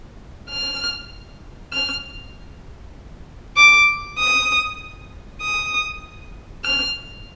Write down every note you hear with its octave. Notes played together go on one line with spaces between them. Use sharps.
F6
F6
D6
D#6
D#6
F6